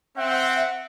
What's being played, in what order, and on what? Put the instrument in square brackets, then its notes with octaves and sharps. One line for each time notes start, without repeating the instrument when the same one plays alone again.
[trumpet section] C4 [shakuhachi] E5 [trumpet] F#5